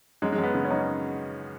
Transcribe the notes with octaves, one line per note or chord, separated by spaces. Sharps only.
F#2 G#3
G#3
F#2
B3
C#3
C#4
F#2 D#4